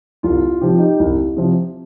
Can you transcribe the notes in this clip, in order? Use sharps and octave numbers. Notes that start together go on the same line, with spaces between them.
C2 F4
C3 F3 G4
F4
D#4 G4
C2
C3 F3